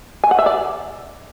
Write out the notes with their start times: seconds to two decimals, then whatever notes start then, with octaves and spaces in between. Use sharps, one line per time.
0.24 G#5
0.31 F#5
0.39 E5
0.46 D5